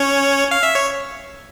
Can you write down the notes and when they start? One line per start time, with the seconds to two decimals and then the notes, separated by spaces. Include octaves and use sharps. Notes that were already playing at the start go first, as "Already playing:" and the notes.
Already playing: C#4 C#5
0.51 F5
0.63 E5
0.75 C#5